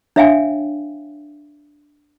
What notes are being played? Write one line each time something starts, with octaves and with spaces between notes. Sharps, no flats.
D4 C#5 E5 F5 G5 G#5